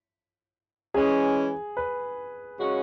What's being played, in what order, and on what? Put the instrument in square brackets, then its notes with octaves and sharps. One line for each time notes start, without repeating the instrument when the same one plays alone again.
[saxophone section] E3 G#3 C#4 [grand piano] G#4
[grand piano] B4
[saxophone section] C#3 G#3 C#4 F#4